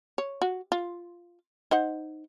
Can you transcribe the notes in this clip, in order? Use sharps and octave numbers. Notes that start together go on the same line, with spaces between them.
C#5
F#4
F4
D#4 C5 F#5